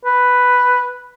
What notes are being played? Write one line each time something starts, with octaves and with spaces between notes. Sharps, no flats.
B4